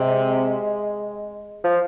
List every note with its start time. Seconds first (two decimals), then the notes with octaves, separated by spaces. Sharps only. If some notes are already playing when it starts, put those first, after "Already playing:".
Already playing: C3 G#3
1.64 F3